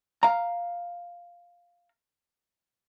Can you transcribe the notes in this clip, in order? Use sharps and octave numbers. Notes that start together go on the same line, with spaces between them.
F5 A#5